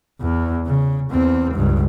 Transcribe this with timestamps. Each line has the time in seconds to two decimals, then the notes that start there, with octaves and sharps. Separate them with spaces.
0.21 E2
0.66 C#3
1.11 E2 C4
1.54 C#2 G2